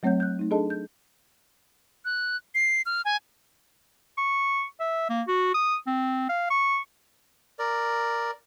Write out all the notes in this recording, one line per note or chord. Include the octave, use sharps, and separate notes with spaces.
F#3 A3 C4 C#5 F#5 G6
F#6 G6
A3 D#4
D4 G#4 A4 D#5 A5
G6
F#6
C7
F6
G#5
C#6
E5
A#3
F#4
D#6
C4
F5
C#6
A#4 D5